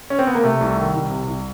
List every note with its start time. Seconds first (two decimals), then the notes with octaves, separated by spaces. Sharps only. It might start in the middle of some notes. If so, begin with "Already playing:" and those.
0.10 C#4
0.19 C4
0.27 B3
0.35 A#3
0.43 C3 A3
0.61 C2
0.77 D#3
0.94 C2
1.10 C3
1.27 C2